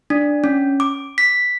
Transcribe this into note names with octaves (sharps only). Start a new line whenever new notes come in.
D4
C#4
D6
B6